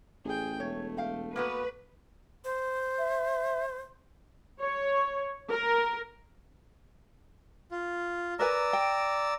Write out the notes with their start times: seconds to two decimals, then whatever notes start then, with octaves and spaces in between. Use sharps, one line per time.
0.25 A1 G#4 G5
0.60 E1 A3 C#5
0.97 F5 G5
1.36 A#3 B3 F#4 B4
2.45 C5
2.98 E5
4.60 C#5
5.49 A#4
7.71 F4
8.39 A#4 B4 D5 G#5 A#5 E6
8.73 G5